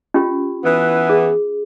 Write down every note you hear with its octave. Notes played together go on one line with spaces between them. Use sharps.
C#4 F4 G4
E3 B3
G#4